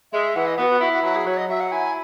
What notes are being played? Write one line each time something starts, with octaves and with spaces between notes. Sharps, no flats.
G#3 E5
E3 F#5
D#5
B3 F#4
F#4
E4 F#4
F#4
F#3 F#4
G#4
F#3 C#5
D#5
F#3 E5
F#5
E4 G#5